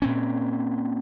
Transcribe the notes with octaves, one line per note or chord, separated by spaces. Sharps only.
A#2 C4 C#4